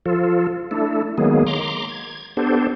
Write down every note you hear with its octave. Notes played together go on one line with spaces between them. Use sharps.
F3 F4 A4
A3 D4 E4 A4
D#3 F#3 G#3 A#3 B3 G#4
A#5 C6 D6
G#6
B3 D4 G4 A4 C5